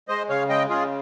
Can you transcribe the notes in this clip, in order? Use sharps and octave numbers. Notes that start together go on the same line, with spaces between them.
G#3 C5 D#5
C#3 C#5 F5
G#3 D#5 G5
C#3 F4 G#4